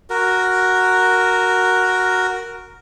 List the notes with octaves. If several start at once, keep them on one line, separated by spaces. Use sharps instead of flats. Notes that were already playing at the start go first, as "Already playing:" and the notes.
F#4 A#4